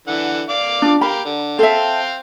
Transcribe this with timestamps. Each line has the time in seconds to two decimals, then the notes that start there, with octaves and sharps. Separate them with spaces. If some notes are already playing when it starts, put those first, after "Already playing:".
0.07 D3 E3 F#5
0.49 D5 F5 D6
0.82 D4 F4
1.01 G4 A#4 F5 B5
1.25 D3
1.59 C4 A4 E5 F5 G5